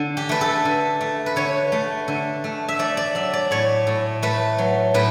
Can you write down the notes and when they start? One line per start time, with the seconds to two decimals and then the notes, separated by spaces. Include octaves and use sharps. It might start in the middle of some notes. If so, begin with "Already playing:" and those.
Already playing: D3
0.17 G4
0.29 A3 B4
0.41 A4
0.65 D3
1.01 A3
1.26 B4
1.36 D3 C#5
1.72 A3
2.08 D3
2.44 A3
2.69 E5
2.79 A3 D5
2.97 D5
3.15 F#3 E5
3.33 D5
3.51 A2 C#5
3.87 A2
4.22 A3 B4
4.58 F#3
4.94 A2 B4